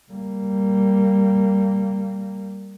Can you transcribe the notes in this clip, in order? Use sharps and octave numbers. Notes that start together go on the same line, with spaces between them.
G3 A#3